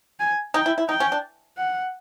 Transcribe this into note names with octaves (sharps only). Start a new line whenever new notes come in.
G#5
D#4 G5
E4
E4
D#4 G5
C#4
D4
F#5